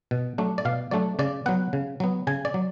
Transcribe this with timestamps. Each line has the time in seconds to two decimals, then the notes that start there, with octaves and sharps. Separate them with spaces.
0.11 B2
0.38 F#3 A3 D4
0.58 D5
0.65 B2 F5
0.91 F#3 A3 D4 D5
1.19 C#3 D5
1.46 F#3 B3 F#5
1.73 C#3
2.00 F#3 B3
2.27 C#3 G#5
2.45 D5
2.54 F#3